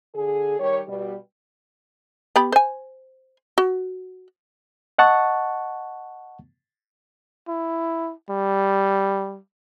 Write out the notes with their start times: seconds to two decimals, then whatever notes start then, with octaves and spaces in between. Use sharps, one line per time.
0.14 D3 G#4
0.59 D#3 G3 G4 C#5
0.87 B2 G3
2.36 B3 G4 B5
2.52 C5 G#5
3.58 F#4
4.99 D#5 F#5 A5 C#6
7.48 E4
8.30 G3